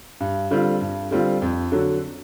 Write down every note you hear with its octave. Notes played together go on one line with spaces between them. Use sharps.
G2
D3 G3 C4 F4
G2
D3 G3 C4 F4
F2
D3 F#3